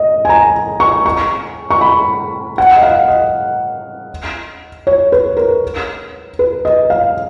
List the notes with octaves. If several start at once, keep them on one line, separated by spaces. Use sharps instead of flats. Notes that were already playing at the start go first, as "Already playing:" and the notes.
Already playing: D#5
G#5
A#5
C#6
C#6
C#6
B5
F#5
D#5
F5
D#5
C#5
B4
A#4
B4
D#5
F5